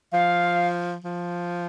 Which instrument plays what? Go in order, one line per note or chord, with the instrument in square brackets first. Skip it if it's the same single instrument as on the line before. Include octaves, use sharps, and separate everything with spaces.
[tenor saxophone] F3 [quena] F5
[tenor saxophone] F3